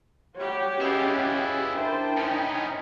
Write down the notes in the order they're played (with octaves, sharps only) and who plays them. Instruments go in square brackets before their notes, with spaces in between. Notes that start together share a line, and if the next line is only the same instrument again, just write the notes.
[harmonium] G3 [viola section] F#4 G4 [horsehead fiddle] C#5
[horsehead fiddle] C#4 [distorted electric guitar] E4 F4 [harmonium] G#4 B4 D#5
[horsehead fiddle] D4 G5 [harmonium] E4 [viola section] A#4 C5 A5
[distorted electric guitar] B3 C#4 [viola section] D#4